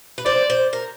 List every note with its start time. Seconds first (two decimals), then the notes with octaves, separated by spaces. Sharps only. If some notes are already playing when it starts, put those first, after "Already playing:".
0.18 B4
0.26 C5 D5
0.50 C5
0.73 A#4